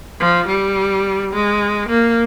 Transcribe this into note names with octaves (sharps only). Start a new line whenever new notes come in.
F3
G3
G#3
A#3